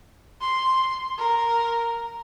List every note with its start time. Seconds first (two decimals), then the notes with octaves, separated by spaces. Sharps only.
0.41 C6
1.18 A#4